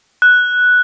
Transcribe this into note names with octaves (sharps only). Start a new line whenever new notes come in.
F#6